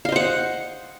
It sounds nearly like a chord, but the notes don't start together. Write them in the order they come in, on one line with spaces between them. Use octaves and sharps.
F5 D#5 C5 F#5